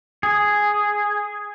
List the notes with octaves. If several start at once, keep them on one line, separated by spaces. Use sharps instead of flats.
G#4